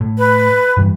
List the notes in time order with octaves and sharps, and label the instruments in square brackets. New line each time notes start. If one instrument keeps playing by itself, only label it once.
[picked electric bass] A2
[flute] B4
[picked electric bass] G2 E3 G3